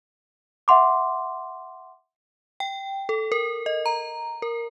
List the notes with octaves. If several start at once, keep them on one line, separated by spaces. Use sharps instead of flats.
E5 F#5 C6 D6
G5
A4
A#4
D#5
A#5
A#4